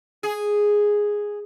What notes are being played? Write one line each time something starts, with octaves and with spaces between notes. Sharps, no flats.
G#4